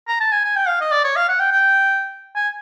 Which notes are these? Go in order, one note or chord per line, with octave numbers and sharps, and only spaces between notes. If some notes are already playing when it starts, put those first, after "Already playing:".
A#5
A5
G#5
G#5
G5
F5
D#5
D5
C#5
F5
F#5
G5
G5
G#5